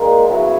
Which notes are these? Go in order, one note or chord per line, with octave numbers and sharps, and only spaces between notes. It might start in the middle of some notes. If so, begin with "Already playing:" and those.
Already playing: A#2 G#3 D#4 A#4
C#3 F#3 B3 E4